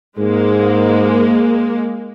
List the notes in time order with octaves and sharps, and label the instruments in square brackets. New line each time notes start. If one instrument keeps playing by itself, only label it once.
[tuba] G#2 [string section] G#3 A#3